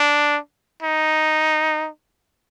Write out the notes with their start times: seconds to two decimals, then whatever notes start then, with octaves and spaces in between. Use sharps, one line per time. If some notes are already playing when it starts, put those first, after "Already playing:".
Already playing: D4
0.83 D#4